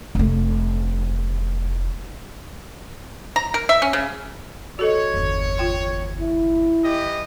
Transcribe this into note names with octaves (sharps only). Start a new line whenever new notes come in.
F1 A3
A#5
A#4
E5
C#4
C#3
F#4 A4 C#5 D#5
G1 E2
F4 G5 C6
E4
E3 G4 D#5